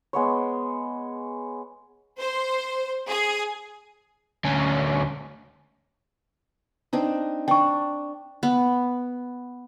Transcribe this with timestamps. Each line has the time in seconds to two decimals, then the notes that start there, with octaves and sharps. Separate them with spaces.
0.13 G#3 B3 C#5
2.20 C5
3.09 G#4
4.45 D2 C#4
6.93 C4 D4 D#4
7.48 D4 G5 C#6
8.43 B3